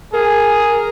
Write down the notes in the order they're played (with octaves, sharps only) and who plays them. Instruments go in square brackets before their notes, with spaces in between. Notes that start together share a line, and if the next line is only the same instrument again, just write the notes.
[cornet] G#4 [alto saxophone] A#4